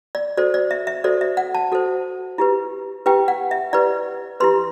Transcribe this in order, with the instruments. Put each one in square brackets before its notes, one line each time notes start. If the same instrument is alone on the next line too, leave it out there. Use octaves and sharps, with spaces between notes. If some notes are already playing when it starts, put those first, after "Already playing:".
[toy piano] D5
F#4 A4 C5 D5
D5
E5
E5
F#4 A4 C5 D5
E5
F#5
A5
F#4 A4 C5
E4 G4 B4
E4 G4 B4 G5
F#5
E5
E4 G4 B4 D5
E4 G4 B4 C6